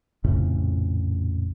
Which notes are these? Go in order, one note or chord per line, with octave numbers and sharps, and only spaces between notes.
A#1 F2 A2 C#3